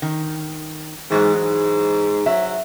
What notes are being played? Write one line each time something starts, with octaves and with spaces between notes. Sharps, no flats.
D#3
G#2 E3 F#3 G#3
G#2
F#3 E5